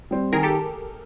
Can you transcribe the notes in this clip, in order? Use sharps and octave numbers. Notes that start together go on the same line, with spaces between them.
G3 C4
D#3 G#4 A#4
G4 A4